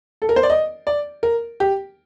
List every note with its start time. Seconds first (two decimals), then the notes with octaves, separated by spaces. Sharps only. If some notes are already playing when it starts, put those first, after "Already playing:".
0.22 A4
0.29 A#4
0.36 C5
0.43 D5
0.50 D#5
0.87 D5
1.23 A#4
1.60 G4